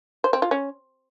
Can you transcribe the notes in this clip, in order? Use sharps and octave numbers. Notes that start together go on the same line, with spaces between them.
C5
C4
F4
C#4